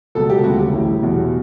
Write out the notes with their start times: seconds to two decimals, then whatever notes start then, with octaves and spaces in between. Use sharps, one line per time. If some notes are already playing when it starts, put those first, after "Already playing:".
0.15 C#2 B2 F#3 A4
0.30 G4
0.44 D2 C#3 G3 F#4
0.59 G4
0.73 A1 A2 G3
1.02 E2 B2 F#3